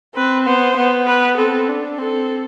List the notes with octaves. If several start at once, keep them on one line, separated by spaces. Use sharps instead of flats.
C4 B4
B3 C5
B3
B4
C4 A4
D4
C4 A4